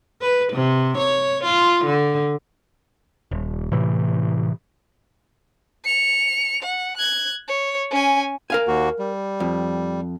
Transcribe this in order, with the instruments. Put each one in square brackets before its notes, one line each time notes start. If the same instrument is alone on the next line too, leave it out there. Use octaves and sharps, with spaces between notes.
[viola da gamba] B4
C3
C#5
F4
D3
[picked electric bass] D#1
A2 C3 E3
[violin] C#7 F7
F#5
F#6 G#6
C#5
C#4 G#5
[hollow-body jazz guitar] A#4 F5 G#5
[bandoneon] D#2 A#3 F#4
G3
[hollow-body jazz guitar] F2